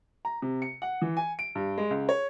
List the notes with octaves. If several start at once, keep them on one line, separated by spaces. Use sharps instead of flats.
A#5
C3
C#7
F#5
E3
G#5
D7
G2
G#3
C#2
C#5